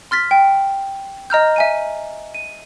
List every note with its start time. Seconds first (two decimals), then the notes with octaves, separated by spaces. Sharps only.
0.11 C6 F6 A6 B6
0.31 G5
1.30 D#5 A#5 F6 G6
1.56 E5 G#5 D#7
2.35 D#7